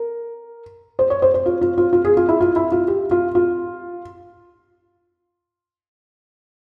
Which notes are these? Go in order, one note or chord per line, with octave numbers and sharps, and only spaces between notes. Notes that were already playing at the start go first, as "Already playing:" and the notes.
Already playing: A#4
C5
C#5
C5
C5
F4
F4
F4
F4
G#4
F4
E4
F4
E4
F4
G4
F4
F4